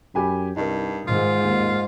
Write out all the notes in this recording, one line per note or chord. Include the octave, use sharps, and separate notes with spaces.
F#2 G4 G#5 B5
C2 G2 D#4 A#4
G#2 D#3 F4
D#2